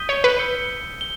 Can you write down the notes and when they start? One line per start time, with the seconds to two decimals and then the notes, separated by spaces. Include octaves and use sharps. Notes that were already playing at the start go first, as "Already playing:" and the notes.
Already playing: D#6 G6 B6 D#7 G7
0.09 C#5
0.24 B4
0.39 E6 G6 C#7 G7
1.01 G7